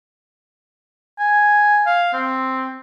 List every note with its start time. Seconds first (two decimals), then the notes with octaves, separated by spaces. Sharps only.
1.19 G#5
1.86 F5
2.13 C4